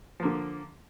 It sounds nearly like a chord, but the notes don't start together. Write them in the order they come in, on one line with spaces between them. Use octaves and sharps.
F3 A#3 D3